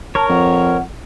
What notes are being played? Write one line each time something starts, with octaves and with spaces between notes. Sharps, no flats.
A#4 C#5 A5
F2 F#5